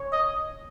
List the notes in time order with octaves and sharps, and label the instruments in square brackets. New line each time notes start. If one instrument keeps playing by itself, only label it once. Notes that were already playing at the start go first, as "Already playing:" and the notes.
Already playing: [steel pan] C#5
[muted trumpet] D#5